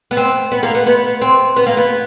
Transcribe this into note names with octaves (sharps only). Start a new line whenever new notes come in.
B3
C4
B3
A#3
B3
B3
C4
B3
A#3
B3